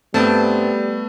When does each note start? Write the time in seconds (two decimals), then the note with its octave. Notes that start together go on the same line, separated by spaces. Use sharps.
0.14 G2 G3 A3 B3 C4 A5